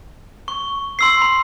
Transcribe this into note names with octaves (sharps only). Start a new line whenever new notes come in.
C#6
C6 E6 C7
B5